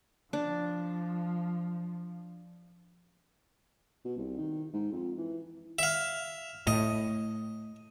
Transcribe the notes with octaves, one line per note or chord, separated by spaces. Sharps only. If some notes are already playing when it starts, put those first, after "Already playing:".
F3 D4
B2
C2
D#3
G#2
F2
E3
E5 F5
A2 D#5